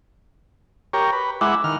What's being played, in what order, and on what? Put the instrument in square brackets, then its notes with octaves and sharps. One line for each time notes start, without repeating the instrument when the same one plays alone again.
[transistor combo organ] G4 A#4 C#5
B4
[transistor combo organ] G#3 E4 F#5 [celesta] D6
[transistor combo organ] D#3 F6